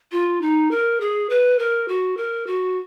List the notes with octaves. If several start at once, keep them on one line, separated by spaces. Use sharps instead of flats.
F4
D#4
A#4
G#4
B4
A#4
F#4
A#4
F#4